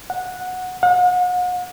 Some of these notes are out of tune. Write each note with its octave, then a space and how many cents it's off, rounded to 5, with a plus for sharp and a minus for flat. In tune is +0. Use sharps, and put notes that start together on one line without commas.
F#5 -10
F#5 -40